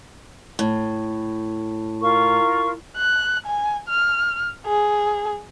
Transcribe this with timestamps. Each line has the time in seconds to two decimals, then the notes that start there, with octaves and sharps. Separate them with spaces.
0.59 A2
2.01 F4 A#4 C#6
2.97 F#6
3.47 G#5
3.88 F6
4.66 G#4